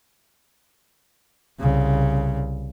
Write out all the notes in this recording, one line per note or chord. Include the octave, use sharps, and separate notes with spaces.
C2 C#3